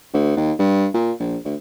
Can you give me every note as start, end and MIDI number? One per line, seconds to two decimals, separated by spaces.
0.14 0.34 38
0.36 0.53 39
0.59 0.87 43
0.94 1.12 46
1.20 1.37 34
1.45 1.55 38